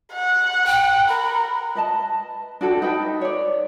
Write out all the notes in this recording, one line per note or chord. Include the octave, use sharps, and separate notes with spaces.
F#5
G5
A#4 B5
B4 D#5 A5
D4 F#4 A4 G5
D#4 B4 G5
C#5 D5